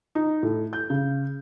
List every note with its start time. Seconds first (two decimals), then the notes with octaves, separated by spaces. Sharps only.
0.15 D#4
0.43 A2
0.73 G6
0.90 C#3